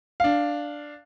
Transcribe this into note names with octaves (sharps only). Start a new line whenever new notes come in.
D4 F5